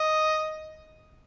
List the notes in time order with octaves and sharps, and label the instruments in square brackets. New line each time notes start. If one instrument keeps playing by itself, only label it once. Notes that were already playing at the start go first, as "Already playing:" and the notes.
Already playing: [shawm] D#5